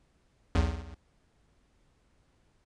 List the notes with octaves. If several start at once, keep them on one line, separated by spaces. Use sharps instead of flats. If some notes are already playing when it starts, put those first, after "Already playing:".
B1 E2